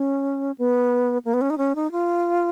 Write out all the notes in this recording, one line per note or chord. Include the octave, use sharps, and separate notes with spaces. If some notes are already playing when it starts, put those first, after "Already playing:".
Already playing: C#4
B3
A#3
B3
C#4
D#4
C#4
D#4
F4